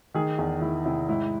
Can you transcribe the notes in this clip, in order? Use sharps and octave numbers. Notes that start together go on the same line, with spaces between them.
D#3 G#4
E2 G#4
D#3 E4
C3 E4
G#2 E4